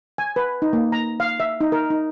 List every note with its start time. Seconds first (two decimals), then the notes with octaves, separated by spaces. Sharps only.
0.18 G#5
0.36 B4
0.62 D#4
0.73 A#3
0.92 A#5
1.20 F5
1.40 E5
1.61 D#4
1.72 A#4
1.90 D#4